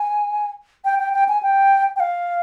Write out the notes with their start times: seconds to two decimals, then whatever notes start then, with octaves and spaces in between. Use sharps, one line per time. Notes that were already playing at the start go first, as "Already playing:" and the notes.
Already playing: G#5
0.84 G5
0.99 G5
1.13 G5
1.28 G#5
1.42 G5
1.96 G5
2.00 F5